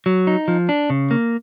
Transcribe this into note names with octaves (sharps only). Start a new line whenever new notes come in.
F#3
D#4
F3
D4
C#3
A#3